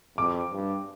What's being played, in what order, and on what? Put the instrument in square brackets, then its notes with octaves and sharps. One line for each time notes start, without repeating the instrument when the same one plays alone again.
[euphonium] F2 [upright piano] D6
[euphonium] G2